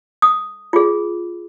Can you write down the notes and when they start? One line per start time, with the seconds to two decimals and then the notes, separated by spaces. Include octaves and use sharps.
0.22 D#6
0.73 F4 G#4